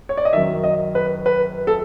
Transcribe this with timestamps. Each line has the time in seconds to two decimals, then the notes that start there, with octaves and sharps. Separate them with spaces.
0.09 C#5
0.17 D5
0.25 D#5
0.33 F#2 D#3 E5
0.64 D#5
0.95 B4
1.26 B4
1.67 A4